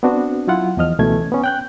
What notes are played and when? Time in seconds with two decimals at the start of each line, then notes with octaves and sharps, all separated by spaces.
0.03 B3 C4 D4 F#4
0.47 F#3 E4 F4 F#5
0.77 E2 F3 D#5 F6
0.99 C#2 B2 E3 A3 C#4 G#6
1.32 B3 C#4
1.44 G5 F#6 G6